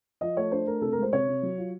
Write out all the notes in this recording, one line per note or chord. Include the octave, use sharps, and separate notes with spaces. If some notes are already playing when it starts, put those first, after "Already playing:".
F3 D#5
A3 C#5
D4 C5
A3 A#4
C3 A4
A#4
G#3
C5
C3 C#5
C3
F#3
F4